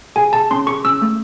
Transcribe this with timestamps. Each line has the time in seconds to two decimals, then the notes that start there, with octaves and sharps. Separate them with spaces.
0.16 G#4 G#5
0.33 G#4 A5
0.51 C#4 C6
0.67 G#4 C#6
0.85 C#4 E6
1.02 A3